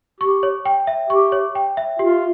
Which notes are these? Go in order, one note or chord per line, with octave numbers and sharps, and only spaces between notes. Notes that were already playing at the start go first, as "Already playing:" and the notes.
G4 C#6
C#5
G5
E5
G4 C#6
C#5
G5
E5
F4 G4